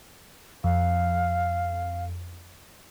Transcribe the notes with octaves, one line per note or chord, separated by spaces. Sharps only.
F2 F5